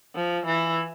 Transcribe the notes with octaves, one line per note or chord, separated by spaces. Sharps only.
F3
E3